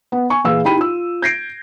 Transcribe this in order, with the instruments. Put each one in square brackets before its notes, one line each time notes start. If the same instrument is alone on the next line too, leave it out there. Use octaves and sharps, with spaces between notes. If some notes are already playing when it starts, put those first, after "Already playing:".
[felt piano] B3
G#5 C#6
A#2 E3 G#4 B4 F5 E6
D#4 E4 G4 G5 B5 D#7
F4 E6
G6 G#6 A#6 C7 D7